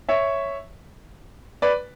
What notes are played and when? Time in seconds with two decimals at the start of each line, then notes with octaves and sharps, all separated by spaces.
0.09 C#5 E5
1.62 B4 D5